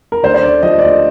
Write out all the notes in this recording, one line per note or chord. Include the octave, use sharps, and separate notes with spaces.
A#4
D2 C5
C5
D2 D5
F3 D#5
D5
D2 D#5